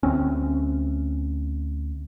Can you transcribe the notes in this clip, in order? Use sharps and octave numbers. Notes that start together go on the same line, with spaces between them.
D2 C4 C#4